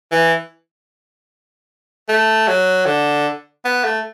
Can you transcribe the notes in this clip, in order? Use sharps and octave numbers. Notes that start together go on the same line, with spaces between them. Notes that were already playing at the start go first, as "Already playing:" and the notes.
E3
A3
F#3
D3
B3
A3